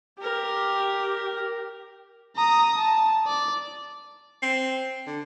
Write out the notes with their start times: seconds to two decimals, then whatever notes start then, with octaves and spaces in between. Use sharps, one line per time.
0.22 G4 A#4
2.36 A#5 D#6
2.78 A5
3.27 D5
4.43 C4
5.07 D3